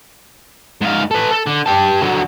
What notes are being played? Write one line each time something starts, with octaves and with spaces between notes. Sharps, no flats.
G#2 F5
A4 B4
A4
D3
G4 A5
D3 F#3